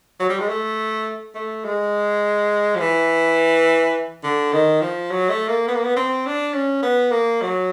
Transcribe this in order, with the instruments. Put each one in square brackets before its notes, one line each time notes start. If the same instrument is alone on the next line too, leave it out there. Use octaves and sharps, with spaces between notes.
[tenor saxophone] F#3
G3
G#3
A3
A3
G#3
F3
E3
D3
D#3
F3
F#3
A3
A#3
B3
A#3
B3
C4
D4
C#4
B3
A#3
F#3